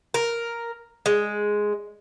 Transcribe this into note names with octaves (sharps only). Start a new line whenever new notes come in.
A#4
G#3